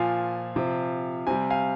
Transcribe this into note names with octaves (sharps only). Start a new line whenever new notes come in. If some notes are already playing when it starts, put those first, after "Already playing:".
Already playing: A#2 F3 F5 G#5
C3 F3
C3 G3 G#5
F5 G#5